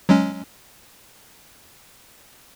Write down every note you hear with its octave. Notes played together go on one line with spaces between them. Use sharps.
F#3 G#3 C#4